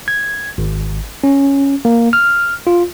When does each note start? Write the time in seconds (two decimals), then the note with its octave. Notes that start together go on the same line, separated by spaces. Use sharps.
0.08 G#6
0.58 G#1
1.24 C#4
1.85 A#3
2.13 F6
2.67 F4